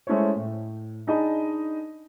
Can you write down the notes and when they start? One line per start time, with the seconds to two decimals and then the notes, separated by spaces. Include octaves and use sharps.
0.07 G#3 A3 C#4 E4 C5 C#5
0.36 A2
1.07 D4 D#4 G#4 D#5 A5 B5